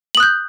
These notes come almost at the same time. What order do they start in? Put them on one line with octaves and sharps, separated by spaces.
F#7 D#6 F#6 G6